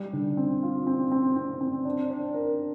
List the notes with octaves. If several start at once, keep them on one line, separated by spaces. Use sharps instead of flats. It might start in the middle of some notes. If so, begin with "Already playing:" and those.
Already playing: G3
D3
C4
F4
C4
C4
C4
C4
D4
D4
A#4